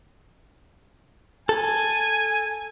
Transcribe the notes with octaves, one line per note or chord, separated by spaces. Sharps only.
A4 G#5